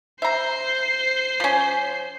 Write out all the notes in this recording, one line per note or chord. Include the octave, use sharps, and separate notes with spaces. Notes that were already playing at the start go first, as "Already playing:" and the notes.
C5 E5 A#5 C7
F3 C#4